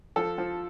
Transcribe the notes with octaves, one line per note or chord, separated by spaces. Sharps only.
F3 A4
F3